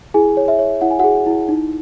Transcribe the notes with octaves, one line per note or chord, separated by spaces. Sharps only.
E4 G#4 G#5
C#5
E5
C#5
E4 F#5
G#5
F#4 G#4 F#5
E4
D#4